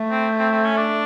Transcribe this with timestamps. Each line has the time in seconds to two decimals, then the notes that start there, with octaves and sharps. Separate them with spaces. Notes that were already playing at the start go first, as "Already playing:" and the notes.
Already playing: A3
0.10 C4
0.39 C4
0.52 C4
0.65 C#4
0.77 D4